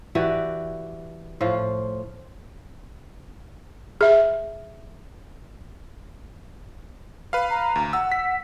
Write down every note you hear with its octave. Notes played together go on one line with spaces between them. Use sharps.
E3 F#4 G4 D5
A2 F3 F4
G#4 E5
B4 F5
A#5
D2
F#5 E6
B6